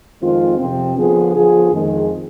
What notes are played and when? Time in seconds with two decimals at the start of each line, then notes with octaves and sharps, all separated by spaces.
0.21 F2 D#3 G#3 C4 F4
0.59 F2 C3 F3 C4
0.96 D3 F3 B3 F4 G#4
1.35 D3 F3 B3 F4 G#4
1.72 F2 D#3 G#3